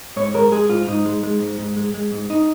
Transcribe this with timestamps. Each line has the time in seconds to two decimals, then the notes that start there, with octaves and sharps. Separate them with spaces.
0.16 G#2 C#5
0.34 G#3 A#4
0.52 G#3 G#4
0.69 G#2 F4
0.87 G#2 D#4
1.06 G#3
1.23 G#3
1.40 G#2
1.59 G#2
1.76 G#3
1.94 G#3
2.12 G#2
2.30 D#4